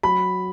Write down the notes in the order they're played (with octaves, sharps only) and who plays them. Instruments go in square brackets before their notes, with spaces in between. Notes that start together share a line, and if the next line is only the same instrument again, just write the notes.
[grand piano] F#3 B5